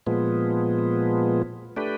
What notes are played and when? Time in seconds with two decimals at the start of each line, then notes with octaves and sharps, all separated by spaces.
0.06 A#2 F3 G#3 B3
1.76 A3 D4 G4 B4